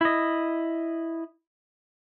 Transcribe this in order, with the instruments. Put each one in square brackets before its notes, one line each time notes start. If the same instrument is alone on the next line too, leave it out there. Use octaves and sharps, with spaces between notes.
[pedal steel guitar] E4 D#5